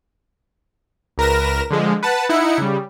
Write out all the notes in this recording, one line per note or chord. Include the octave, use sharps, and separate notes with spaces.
C#2 A#4 B4 A#6 E7
D3 F3 G#3
B4 F#5 A5
D#4 E4 F#5 C#7
C#3 G3